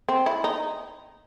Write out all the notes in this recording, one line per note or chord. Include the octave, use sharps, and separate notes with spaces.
C4
E4
D#4